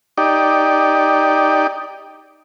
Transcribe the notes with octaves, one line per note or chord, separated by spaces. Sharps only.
D#4 G4 D5